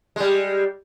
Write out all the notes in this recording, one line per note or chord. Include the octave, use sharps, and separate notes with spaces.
G3 G#3